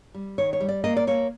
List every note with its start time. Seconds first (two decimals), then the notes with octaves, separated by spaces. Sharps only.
0.15 G3
0.38 D#3 C#5
0.53 C#5
0.60 G3
0.69 D5
0.84 A#3 D#5
0.96 D5
1.07 A#3 C#5